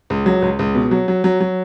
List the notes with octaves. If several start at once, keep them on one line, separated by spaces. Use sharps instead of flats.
C#2
F#3
C#2
C#2
B2
F#3
F#3
F#3
F#3